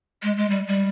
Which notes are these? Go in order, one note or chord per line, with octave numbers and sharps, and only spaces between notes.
G#3
G#3
G3
G3